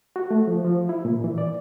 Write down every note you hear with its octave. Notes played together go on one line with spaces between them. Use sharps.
F#4
A3
F3
F3
E4
A#2
E3
D5